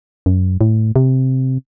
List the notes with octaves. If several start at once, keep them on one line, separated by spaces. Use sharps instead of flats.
F#2
A2
C3